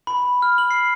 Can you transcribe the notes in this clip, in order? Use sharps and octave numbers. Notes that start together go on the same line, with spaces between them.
B5
F6
F#7
C7